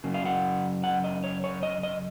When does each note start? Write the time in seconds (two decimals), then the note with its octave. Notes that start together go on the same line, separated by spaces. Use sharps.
0.04 F#2 C#3
0.14 F5
0.25 F#5
0.84 F#5
1.04 D#5
1.24 C#5
1.44 C#5
1.63 D#5
1.83 D#5